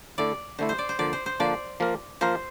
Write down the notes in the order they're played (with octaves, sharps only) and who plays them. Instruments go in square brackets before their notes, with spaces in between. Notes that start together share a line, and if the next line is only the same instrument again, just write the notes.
[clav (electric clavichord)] D3 A3 E4 [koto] D5
[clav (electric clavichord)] D3 A3 E4 [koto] C5
[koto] C5
D5
C5
[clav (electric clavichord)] D3 F3 A#3 D4 [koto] D5
[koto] C5
C5
[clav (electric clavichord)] D3 F3 A#3 D4 [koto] D5
[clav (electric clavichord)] F3 A#3 F4 A#4
[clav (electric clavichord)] F3 A#3 F4 A#4 [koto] C5